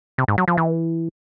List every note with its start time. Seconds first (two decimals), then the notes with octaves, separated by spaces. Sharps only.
0.18 C3
0.28 G#2
0.38 F#3
0.48 F3
0.57 E3